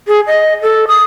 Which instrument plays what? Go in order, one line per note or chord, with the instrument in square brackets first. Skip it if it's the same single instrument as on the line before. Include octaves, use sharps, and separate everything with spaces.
[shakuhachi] G#4
D#5
A4
D#6